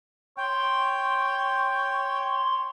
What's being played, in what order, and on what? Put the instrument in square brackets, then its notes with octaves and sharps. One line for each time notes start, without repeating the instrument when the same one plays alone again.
[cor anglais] C#5 [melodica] G5 [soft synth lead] C6